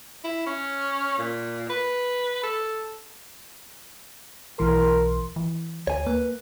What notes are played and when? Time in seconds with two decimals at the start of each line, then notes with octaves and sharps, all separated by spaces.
0.24 E4
0.47 C#4
1.18 A#2
1.70 B4
2.43 A4
4.59 B1 E3 A#4 C6
5.36 E3
5.87 D2 C#5 G#5
6.07 A#3 B4